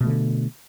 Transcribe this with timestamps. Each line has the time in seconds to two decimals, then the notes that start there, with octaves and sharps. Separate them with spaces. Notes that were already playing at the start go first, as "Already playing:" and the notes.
0.01 B2
0.04 A3
0.07 D3